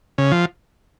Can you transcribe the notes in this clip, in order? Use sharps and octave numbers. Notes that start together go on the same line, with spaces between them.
C#3
F3